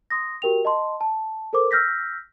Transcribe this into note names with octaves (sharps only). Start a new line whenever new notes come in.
C6 D#6 A#6
F#4 G4 A#4 G5 F7
D#5 A5 C6
A5
A4 A#4 C5 D6
E6 F6 G6 A#6 B6